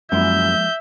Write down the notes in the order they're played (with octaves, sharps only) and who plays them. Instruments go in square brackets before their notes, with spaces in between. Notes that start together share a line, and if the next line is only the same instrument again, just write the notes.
[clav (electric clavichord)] F#2 E4 [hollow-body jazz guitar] F3 G#3 A#3 [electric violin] E5 [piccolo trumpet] G6